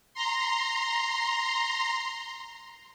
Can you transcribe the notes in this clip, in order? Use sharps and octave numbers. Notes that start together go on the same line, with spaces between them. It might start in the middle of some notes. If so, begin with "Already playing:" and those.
A#5 C6